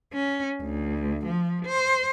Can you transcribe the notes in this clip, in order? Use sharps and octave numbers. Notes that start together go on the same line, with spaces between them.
C#4
D2
F3
C5